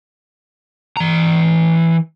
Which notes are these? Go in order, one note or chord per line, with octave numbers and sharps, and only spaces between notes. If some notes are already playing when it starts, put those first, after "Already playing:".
E3 A#5